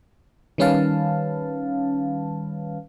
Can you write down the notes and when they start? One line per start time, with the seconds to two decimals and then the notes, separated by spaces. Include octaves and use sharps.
0.58 D#3 G3 C#4 B4 F5 A5